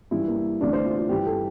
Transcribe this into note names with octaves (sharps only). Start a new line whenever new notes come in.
G2 E3 E4
A#3
D2 C3 E3 D4
C5
F4
F4
G2 E3 G4
A4